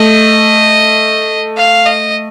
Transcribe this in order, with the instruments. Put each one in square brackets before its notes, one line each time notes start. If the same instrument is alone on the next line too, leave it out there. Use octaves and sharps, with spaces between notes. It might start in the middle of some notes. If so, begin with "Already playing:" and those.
Already playing: [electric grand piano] A3 [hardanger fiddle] D#5
[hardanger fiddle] F5
D#5